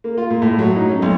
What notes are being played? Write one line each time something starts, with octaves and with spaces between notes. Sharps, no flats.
A#3
F4
A#2
A2
F#3
D#4
C#4
B1